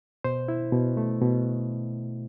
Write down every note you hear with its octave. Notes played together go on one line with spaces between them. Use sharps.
B2 C5
E4
B2
A3
B2